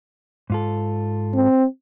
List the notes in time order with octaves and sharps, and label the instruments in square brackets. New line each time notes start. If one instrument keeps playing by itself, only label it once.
[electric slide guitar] G#2 F4 A4
[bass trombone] C4